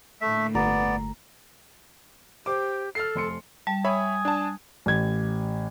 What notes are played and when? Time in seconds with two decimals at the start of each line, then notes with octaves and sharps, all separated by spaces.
0.21 A2 D3 A3 A#3 E5
0.55 G1 B3 D5 A#5
2.46 G4 C5 D6
2.95 A4 F6 A6 C7
3.15 F1 C6 C#7
3.67 G3 A5
3.85 C#5 E5 G#5 B5 D#6
4.25 D4 A5
4.86 A1 G#6